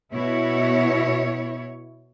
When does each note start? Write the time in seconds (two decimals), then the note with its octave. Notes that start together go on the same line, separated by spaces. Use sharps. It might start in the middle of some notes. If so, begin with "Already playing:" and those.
0.13 B2 E4 C#5